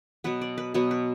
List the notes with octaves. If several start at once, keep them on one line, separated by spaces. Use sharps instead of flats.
B2 F#3 B3 B4
D5
B4
B2 F#3 B3 B4
B4